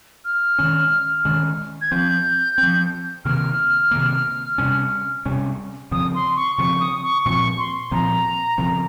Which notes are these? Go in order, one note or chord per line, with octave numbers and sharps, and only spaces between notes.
F6
D#3 G#3 C#4
D#3 G#3 C#4
G#6
F3 C4 G6
C4
F3
C3 D#3 A#3 F6
C3 D#3 A#3
C3 G3 C#4
C3 G3 C#4
C#3 F3 C4 D#6
C6
C#6
C#3 F3 C4 C#6
D#6
C#6
A#2 F3 C4 C#6
C6
A#2 F3 C4 A#5
C#3 F3 C4